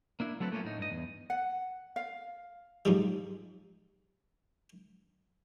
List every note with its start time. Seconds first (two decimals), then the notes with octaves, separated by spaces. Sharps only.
0.20 A#3 D4 E4
0.40 F#3 A3 C4 A4 B4
0.52 A3 A#3 C#4 E4 F4
0.64 A2 D#4
0.78 G2 D#5
0.91 E2
1.30 F#5
1.96 F5
2.85 G#2 F3 G3